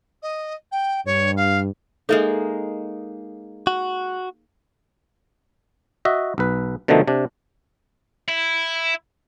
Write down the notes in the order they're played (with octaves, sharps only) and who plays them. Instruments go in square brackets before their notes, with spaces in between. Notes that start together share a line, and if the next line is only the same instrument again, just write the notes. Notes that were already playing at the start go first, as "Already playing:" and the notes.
[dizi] D#5
G5
[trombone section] G2 [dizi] C#5
[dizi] F5
[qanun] G#3 A#3 D#4 [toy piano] A4 E5
[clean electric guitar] F#4
[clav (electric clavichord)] F#4 D#5 E5
B1 B4
B2 D3 D#3 F3 A3 D#4
C3 D4
[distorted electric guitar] E4